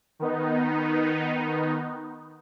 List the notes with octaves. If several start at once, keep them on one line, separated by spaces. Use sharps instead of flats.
D#3 B3 D#4